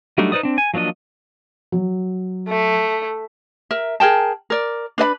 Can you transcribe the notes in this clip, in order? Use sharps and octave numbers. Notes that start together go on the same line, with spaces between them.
F#3 G3 A3 D4 D#4
D#4 B4 C5 D5 D#6
C4 D4
G#5
F3 F#3 A#3 D4 D#5
F#3
A3
A#4 E5
G#4 A#4 G5 A5
A#4 D5
D4 B4 D#5 B5